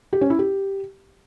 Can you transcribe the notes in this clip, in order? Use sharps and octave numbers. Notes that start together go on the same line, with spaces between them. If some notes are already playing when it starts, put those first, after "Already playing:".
G4
C#4
E4
G4